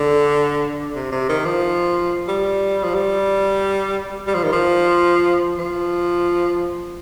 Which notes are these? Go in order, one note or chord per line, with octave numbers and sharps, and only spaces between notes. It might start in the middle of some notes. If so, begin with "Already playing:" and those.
Already playing: D3
C3
C3
D#3
F3
G3
F3
G3
G3
F3
D#3
F3
F3